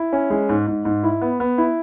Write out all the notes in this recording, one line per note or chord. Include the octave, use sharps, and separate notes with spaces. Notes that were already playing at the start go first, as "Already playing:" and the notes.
Already playing: E4
C#4
G#3
G#2
G#2
G#2
E4
B3
B3
E4